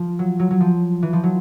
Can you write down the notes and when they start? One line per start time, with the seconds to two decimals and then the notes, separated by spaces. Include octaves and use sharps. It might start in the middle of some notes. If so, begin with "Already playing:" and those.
Already playing: F3
0.19 F#3
0.40 F#3
0.51 F#3
0.61 F3
1.03 E3
1.13 F3
1.23 F#3